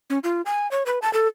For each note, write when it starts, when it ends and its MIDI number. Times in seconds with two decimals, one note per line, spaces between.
0.10 0.19 61
0.24 0.42 65
0.46 0.70 80
0.71 0.83 73
0.86 0.99 71
1.02 1.12 81
1.13 1.27 69